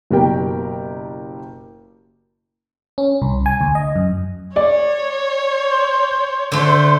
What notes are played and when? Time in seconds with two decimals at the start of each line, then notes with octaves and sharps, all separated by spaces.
0.10 F#1 B2 G4 A#4 G5
2.98 C#4
3.22 C2
3.46 G#5
3.61 D2
3.75 D#5
3.96 F#2
4.56 C#5 D5
6.52 D3 A3 C5